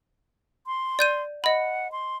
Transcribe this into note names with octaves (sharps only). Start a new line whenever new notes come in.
C6
D5 G6 D#7
D#5 F#5 B5
C6